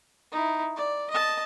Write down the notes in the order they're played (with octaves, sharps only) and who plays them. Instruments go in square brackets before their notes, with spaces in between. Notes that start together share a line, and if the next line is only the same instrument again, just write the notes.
[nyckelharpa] D#4 E4
D5
D#5 A5